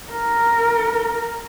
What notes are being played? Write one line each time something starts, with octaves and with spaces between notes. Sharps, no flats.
A#4